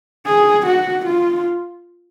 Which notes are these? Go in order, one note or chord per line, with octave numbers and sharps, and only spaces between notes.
G#4
F#4
F4